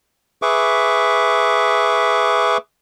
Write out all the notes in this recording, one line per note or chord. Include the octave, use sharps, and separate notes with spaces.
G#4 B4 E5 C#6 D6